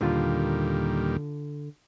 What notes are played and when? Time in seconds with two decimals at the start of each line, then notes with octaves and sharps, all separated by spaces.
0.01 D#2 A#2 D3 G3 F4